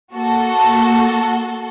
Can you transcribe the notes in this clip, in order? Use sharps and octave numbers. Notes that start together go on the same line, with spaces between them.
A#3 F#4 A4